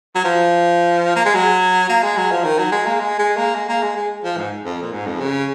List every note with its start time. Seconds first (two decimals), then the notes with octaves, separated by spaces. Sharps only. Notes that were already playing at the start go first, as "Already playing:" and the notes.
0.15 F#3
0.24 F3
1.16 A#3
1.25 G#3
1.35 F#3
1.89 A#3
2.03 G#3
2.17 F#3
2.31 F3
2.44 D#3
2.59 F#3
2.72 G#3
2.86 A#3
3.00 G#3
3.19 G#3
3.37 A#3
3.55 G#3
3.69 A#3
3.83 G#3
3.96 G#3
4.24 F3
4.37 G#2
4.65 F2
4.82 A#2
4.93 G#2
5.06 F2
5.20 C#3